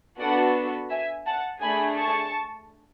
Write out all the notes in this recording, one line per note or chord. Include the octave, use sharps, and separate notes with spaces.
B3 D4 F#4 A4 D5 F#5
E5 G#5
F#5 A5
A3 D4 G#4 G#5 B5
A5 C#6